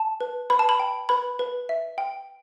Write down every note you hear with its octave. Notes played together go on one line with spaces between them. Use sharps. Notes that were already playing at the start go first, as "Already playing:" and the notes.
Already playing: A5
B4
B4 B5
A5
B5
G5
B4 B5
B4
E5
G5